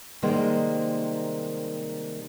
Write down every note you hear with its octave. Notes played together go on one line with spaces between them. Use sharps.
C3 D#3 G3 G#3 A#3 C5